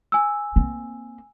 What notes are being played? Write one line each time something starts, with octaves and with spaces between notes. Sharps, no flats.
G#5 E6
A#3 C4